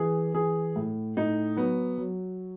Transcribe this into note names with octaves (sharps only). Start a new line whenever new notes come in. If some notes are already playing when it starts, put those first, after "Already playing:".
Already playing: E3 G#4
E3 G#4
A2
A2 D#4
F#3 B3
F#3